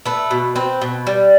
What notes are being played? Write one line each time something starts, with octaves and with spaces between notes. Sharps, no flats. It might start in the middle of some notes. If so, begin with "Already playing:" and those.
A3 B4
B2
C4 B4
B2
G3